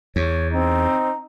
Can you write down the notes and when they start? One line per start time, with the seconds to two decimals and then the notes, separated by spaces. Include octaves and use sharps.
0.16 E2 C#5
0.53 C4 D#4